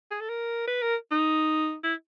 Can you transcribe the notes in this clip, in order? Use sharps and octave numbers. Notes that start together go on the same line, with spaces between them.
G#4
A4
A#4
B4
A#4
D#4
E4